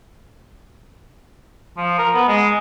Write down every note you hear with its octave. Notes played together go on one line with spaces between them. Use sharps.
F3
A#4
B3
G#3